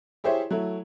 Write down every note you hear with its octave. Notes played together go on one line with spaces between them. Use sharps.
E4 G4 G#4 C5 C#5 E5
F#3 A3 E4